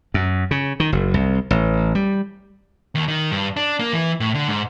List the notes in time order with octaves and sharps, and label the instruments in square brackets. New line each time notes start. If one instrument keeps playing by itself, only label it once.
[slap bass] F#2
C#3
D#3
F#1
C2
A1
G3
[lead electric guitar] D#2
D#3
G2
D4
A#3
E3
A2
D3
G#2